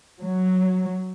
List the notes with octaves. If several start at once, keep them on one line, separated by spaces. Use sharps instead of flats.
F#3